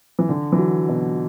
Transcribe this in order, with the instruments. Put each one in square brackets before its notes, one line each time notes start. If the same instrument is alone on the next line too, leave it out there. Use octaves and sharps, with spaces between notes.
[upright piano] E3
D3
E3
F#3
B2